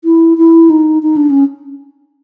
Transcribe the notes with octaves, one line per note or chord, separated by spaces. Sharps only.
E4
E4
D#4
D#4
D4
C#4